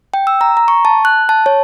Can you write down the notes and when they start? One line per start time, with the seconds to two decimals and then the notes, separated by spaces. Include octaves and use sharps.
0.14 G5
0.27 E6
0.41 A#5
0.57 A#5
0.68 C#6
0.85 A5
1.05 F#6
1.29 A5
1.46 C#5